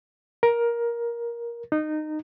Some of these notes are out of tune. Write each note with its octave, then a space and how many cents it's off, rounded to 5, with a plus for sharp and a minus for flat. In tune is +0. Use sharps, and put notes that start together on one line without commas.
A#4 +15
D#4 -20